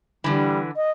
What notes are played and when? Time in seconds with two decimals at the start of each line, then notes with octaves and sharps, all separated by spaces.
0.24 D3 E3 G3
0.76 D#5